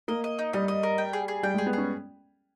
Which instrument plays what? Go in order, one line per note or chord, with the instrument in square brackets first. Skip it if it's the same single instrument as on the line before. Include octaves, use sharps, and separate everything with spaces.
[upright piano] A#3 [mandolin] D#5
[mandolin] D#5
D#4
[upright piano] G3 [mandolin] D#5
[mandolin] D#5
A#4
G5
G#4
G#4
[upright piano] G3 [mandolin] G5
[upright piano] G#3 [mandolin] G#4
[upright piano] B3
[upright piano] C#4 [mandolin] G#4